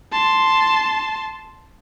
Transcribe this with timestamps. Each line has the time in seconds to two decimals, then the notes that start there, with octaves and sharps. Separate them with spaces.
0.12 A5 C6